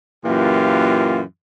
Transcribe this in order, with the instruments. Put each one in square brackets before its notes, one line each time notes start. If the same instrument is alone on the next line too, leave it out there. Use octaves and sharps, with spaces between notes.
[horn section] F#2 A#2 E3 F4 G4